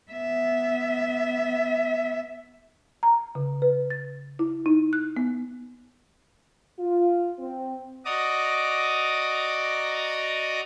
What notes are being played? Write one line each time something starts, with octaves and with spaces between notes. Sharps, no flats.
B3 E5
A#5
C#3
B4
A6
E4
D#4
F#6
B3
F4
C4
F#4 D5 D#5 A#5 D6 D#6